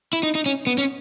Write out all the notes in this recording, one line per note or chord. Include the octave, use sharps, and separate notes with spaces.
E4
D#4
D#4
C#4
B3
C#4